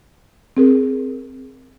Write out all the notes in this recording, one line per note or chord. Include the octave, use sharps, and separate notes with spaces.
C4 G#4 A#4